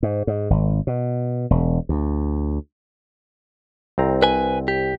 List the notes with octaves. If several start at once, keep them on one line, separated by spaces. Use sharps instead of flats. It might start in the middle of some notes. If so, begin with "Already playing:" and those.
G#2
G#2
G#1
B2
E1
D2
C2 C4 A#5
B4 G#5
G4